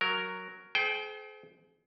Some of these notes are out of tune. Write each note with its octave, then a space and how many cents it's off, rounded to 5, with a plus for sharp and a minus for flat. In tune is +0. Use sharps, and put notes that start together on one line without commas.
F#3 +0 A#4 +0
G#4 +40 C5 -30 G5 +0